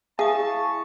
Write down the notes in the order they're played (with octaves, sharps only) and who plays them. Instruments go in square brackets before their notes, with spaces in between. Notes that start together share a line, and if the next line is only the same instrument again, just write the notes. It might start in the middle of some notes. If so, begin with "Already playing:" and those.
[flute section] E4 C#6 [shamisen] G#4 [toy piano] E5 F5 D#6 [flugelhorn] A5